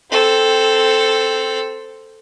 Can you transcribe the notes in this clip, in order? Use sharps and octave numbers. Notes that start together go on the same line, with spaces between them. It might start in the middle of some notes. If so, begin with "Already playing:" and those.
C4 A4